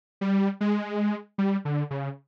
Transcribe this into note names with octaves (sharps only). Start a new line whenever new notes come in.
G3
G#3
G3
D3
C#3